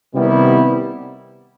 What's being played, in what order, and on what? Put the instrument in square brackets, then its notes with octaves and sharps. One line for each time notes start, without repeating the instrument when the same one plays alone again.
[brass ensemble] C3 D#3 G3 B3 E4